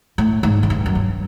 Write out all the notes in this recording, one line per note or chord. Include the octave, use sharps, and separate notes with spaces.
A2
G#2
G#2
G2
F#2
G2